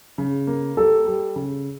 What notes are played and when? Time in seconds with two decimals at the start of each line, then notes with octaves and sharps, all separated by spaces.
0.18 C#3
0.47 A#3
0.77 G3 A4
1.06 G3
1.36 C#3